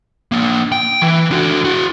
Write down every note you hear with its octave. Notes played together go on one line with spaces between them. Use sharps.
A#3 D4
G5
E3
D4 F#4
E4 F#4